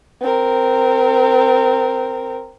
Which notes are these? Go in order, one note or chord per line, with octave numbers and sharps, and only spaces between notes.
C4 A#4